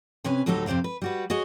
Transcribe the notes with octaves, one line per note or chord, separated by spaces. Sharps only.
C3 C#4 B4 G#5
D2 A2 F#3 G3 D#4 A4
F2 C3 C5 D5 F5
B4
G3 F#4 B4
F#4 G#4 C#5 D#5